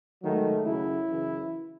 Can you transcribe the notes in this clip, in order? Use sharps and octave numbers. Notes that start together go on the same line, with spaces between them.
G#2 D#3 F#3 A3
F#2 C#3 F#3 E4
F#2 C#3 E3